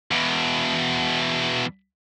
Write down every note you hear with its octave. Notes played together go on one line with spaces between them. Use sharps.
E2 B2